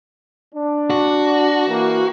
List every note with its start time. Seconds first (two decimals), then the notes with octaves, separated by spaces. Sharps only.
0.55 D4
0.90 F#4
1.67 E3 A#3